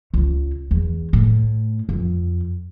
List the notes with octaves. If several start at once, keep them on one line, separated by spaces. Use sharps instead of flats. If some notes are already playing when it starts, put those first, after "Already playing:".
C#2
E2
A2
F2